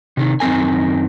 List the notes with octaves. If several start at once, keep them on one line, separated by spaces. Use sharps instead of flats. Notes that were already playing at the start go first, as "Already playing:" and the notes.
C3 D#3
F#2 D#3 C4 A#4 G#5